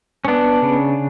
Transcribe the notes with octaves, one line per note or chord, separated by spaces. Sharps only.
C#4
B3 D4
C#3